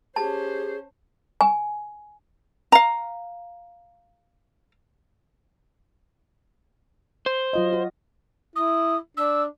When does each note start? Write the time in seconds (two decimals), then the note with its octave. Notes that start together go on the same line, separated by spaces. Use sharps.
0.16 C#4 G4 G#4 C5 A5
1.41 G#5
2.72 F5 A#5
7.26 C5
7.53 F#3 F4 D#5
7.73 F#4
8.56 E4 D#6
9.17 D4 E6